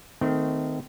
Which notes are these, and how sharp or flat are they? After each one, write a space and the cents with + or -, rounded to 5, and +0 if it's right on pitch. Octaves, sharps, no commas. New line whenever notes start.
D#3 +0 A3 +0 C4 -30